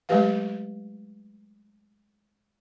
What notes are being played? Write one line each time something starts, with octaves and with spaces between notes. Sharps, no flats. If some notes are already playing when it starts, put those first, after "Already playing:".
F#3 G#3 A3 G4 B4 F5